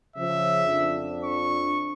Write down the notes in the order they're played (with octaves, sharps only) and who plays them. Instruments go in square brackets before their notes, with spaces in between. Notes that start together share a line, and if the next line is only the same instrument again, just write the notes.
[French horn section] C#3 F3 [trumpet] E5
[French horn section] F2 F3 D4
[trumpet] C#6